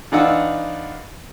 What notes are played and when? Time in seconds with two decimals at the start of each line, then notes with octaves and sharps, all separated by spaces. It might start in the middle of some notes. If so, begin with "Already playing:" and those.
0.12 E3 D4 D#4 F4 F#5 E6